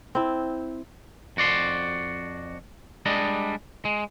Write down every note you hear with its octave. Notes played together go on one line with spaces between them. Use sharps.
C4 E4
F2 F#4 D5 C6
G3 G#3 D4 D#5
G#3